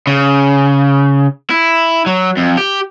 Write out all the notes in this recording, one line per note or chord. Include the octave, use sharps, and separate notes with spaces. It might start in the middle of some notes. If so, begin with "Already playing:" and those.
C#3
E4
F#3
F2
G4